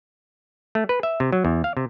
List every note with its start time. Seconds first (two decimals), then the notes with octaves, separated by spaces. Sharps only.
0.75 A3
0.89 B4
1.03 E5
1.20 C3
1.33 F#3
1.45 E2
1.64 F5
1.77 C3